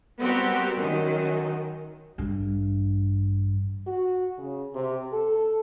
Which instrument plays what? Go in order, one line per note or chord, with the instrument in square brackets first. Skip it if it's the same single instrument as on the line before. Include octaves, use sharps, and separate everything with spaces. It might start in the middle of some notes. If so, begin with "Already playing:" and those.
[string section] G3 B3 C4 F#4 G4 A#4
F#2 D#3
[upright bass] A1 G2
[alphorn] F#4
C#3
C3
A4